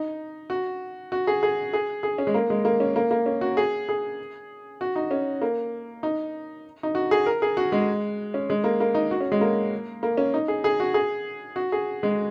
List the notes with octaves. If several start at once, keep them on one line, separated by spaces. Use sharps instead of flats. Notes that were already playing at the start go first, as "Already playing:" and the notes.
Already playing: D#4
F#4
F#4
G#4
G#4
G#4
G#4
C#4
G#3
A#3
G#3
A#3
C#4
A#3
A#3
C#4
F#4
G#4
G#4
F#4
D#4
C#4
A#3
D#4
D#4
F#4
G#4
A#4
G#4
F#4
G#3
C#4
G#3
A#3
A#3
D#4
F#4
C#4
G#3
A#3
A#3
C#4
D#4
G#4
G#4
F#4
G#4
F#4
G#4
G#3